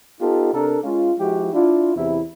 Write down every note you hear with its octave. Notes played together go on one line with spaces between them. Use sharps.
B3 D#4 F4 G4 A4
C3 D4 A4 A#4
G#3 C#4 F4
F3 G#3 E4 F#4 G4
D4 E4 F4
E2 C3 E4